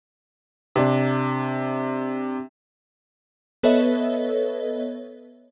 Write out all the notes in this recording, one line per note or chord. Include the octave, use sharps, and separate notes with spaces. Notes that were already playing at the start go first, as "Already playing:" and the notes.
C3 D4
B3 A4 B4 C#5 D#5 E5